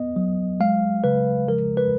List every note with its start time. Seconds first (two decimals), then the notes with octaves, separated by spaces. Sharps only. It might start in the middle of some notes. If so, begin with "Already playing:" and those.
Already playing: B3 D#5
0.16 F#3
0.60 G#3 F5
1.04 C#3 B4
1.48 F3 A#4
1.77 B4